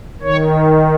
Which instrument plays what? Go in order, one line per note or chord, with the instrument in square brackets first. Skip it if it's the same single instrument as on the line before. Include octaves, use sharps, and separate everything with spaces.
[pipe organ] D#3 C#5